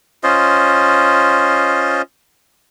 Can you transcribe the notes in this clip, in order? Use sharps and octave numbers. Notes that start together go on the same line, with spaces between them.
C#4 F4 C5 D#5